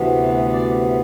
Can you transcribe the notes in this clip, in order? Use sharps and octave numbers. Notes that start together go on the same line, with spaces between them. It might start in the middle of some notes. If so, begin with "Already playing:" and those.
Already playing: D2 C3 E3 B3
D5